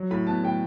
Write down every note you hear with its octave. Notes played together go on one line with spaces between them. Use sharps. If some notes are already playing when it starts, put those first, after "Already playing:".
Already playing: F#3
A2 B5
B3 A5
A2 G5